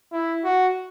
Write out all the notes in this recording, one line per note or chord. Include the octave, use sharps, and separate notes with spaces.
E4
F#4